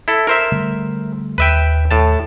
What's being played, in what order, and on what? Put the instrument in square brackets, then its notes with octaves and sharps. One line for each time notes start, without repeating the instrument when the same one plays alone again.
[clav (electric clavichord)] E4 A4
A#4 C5 E5
[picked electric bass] D3 G3 A3
[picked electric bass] D#2 [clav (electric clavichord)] B4 E5 G5
[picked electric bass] D#2 [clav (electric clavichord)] A2 A5